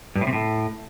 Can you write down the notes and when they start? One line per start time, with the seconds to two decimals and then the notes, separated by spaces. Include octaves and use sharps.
0.16 G2
0.21 A2
0.27 C3
0.33 A2